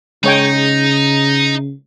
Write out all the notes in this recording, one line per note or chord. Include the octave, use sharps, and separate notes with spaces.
C#3 G#3 D#4 C#5 G5